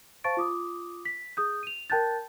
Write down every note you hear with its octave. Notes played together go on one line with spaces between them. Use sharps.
C5 F5 A5 C#6 A6 D7
F4 D6 D#6
B6
G#4 D#6 G6
D#7 F7
A#4 G5 A5 F#6 G6 A6